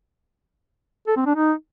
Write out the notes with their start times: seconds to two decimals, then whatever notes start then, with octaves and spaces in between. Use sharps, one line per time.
1.07 A4
1.17 C4
1.26 D4
1.35 D#4